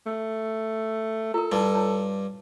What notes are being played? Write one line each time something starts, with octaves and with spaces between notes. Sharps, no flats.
A3
F4 A4 A#4
G2 G3 D#4 E4 A5
F4 C#5 A5